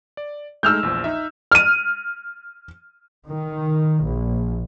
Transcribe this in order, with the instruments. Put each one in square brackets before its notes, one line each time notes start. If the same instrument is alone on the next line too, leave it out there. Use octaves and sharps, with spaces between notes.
[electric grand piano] D5
[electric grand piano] G#3 A3 D#4 [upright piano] E6 F6 G6
[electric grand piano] A#1 E2 F3
D#4 E5
[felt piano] F6 D#7
[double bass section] D#3
A#1